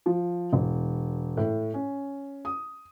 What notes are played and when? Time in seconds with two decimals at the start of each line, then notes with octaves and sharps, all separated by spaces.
0.06 F3
0.53 E1
1.37 A2
1.74 C#4
2.45 D#6